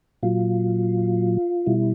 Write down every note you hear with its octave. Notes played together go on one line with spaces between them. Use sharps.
A#2 F#3 F4
B2 G3 E4